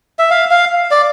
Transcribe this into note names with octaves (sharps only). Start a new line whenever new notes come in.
E5
F5
F5
D5